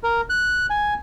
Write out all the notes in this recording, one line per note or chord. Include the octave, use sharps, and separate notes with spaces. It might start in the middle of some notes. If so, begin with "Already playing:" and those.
A#4
F#6
G#5